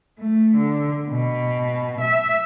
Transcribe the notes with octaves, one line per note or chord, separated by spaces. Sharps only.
A3
D3
B2
E5